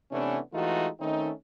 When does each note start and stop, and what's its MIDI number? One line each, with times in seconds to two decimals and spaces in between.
0.12 0.40 48
0.12 0.40 52
0.12 0.40 57
0.12 0.40 59
0.12 0.40 61
0.12 0.40 62
0.54 0.88 52
0.54 0.88 56
0.54 0.88 57
0.54 0.88 63
0.54 0.88 65
0.54 0.88 66
1.00 1.30 51
1.00 1.30 57
1.00 1.30 60
1.00 1.30 61
1.00 1.30 63